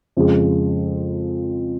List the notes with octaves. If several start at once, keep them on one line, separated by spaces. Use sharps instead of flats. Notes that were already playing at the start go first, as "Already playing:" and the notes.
F2 C#3 G#3